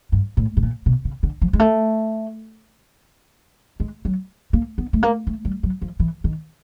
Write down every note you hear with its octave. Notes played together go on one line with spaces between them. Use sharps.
G2
A2
A2
A#2
B2
C#3
D3
F3
G#3
A3
G#3
F#3
A#3
B3
A3
A#3
A3
G3
F#3
F3
E3
D#3